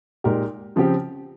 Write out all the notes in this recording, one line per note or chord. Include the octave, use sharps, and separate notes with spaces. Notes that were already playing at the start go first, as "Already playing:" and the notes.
A#2 G#3 D#4 G4 A#4
C#3 F3 C4 G4